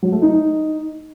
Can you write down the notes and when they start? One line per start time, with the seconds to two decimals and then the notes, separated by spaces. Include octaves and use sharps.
0.03 F#3
0.12 A3
0.22 D#4